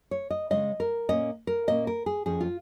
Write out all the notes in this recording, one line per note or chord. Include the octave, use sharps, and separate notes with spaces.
C#5
D#5
C#3 G#3 C#4 D#5
A#4
A#2 A#3 C#4 D#5
A#4
A#2 A#3 C#4 D#5
A#4
G#4
F2 F3 C#4 G#4
F4